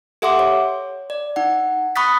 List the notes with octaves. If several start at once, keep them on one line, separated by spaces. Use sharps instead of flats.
G4 A4 E5 F#5 C6 D6
C#5
D5
D#4 F#5
B5 C#6 D#6 F#6 A6 B6